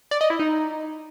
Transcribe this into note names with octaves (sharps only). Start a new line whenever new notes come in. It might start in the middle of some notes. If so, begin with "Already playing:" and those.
D5
D#5
E4
D#4